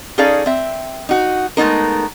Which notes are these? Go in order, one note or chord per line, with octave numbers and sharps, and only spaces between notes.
C#4 D#4 G#4 A4 D5 F5
C4 E5
D#4 F#4
G#3 A3 B3 D#4 A#4